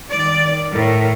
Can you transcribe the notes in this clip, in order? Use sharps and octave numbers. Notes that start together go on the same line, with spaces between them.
D#3 D5
A2 A#4